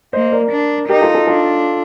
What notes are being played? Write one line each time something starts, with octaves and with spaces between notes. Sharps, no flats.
A#3 C5 D#5
A#4 D5
D4
D#4 G4 A#4
F4 A4
F4 A4
D4 F4 A4